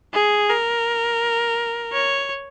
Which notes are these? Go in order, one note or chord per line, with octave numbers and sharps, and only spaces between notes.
G#4
A#4
C#5